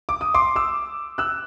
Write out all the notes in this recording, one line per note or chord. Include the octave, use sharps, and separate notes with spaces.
D6
D#6
C6 D6
D6 E6
E6 F#6